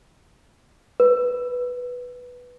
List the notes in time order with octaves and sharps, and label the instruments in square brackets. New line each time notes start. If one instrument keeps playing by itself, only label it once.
[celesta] B4